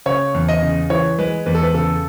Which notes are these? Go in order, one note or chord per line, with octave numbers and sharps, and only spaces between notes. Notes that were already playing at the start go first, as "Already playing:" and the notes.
C#3 C#5
E2
D#5
C#3
E3 C#5
G#3 B4
E2 B4
A4
B4
C#3 A4